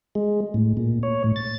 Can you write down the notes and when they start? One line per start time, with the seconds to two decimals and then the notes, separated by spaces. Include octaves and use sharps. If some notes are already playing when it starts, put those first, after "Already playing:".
0.15 G#3
0.54 A2
0.77 A#2
1.03 C#5
1.24 A2
1.36 A6